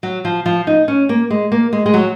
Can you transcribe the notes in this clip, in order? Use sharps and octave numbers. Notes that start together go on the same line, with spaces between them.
F#3
F3
F3
D#4
C#4
A#3
G#3
A#3
G#3
G#3
F#3